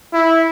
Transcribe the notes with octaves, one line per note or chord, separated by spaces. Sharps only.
E4